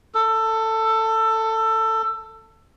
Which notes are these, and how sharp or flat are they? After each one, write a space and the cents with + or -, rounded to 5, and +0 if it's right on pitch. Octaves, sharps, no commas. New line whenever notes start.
A4 +15